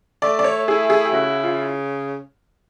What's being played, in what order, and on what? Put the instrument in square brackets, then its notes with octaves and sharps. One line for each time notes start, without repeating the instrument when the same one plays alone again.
[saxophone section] A3 [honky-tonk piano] D5
[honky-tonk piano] D5
C#5
[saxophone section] E4 [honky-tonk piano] G#4
[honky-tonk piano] G#4
G4
[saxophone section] C#3 [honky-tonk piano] F#4
[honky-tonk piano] F4